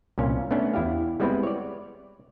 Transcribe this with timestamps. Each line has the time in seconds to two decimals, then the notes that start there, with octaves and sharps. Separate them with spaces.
0.18 C2 A#2 C#4 F5
0.51 A3 B3 C#4 D4
0.73 E2 E4 G4 F5
1.20 G3 G#3 B3 C4 E4 B4
1.43 C#5 D5